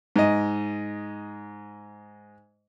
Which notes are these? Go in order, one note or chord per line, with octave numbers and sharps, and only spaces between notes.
G#2 D#5